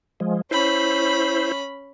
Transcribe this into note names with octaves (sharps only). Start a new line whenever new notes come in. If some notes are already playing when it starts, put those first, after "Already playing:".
F3 G#3
C#4 E4 C5 B5